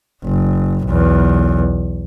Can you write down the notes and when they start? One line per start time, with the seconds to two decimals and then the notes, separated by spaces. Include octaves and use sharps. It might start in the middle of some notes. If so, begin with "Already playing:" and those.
0.24 F#1
0.86 B1 E2